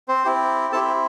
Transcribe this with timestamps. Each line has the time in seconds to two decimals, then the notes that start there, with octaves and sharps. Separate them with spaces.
0.08 C4 C5
0.25 C4 E4 G4
0.72 C4 E4 G4 A4 A5